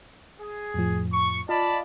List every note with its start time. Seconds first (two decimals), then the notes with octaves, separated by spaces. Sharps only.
0.40 G#4
0.74 F2 A2 F3
1.13 C#6
1.49 F4 D5 D#5 F5 A5 B5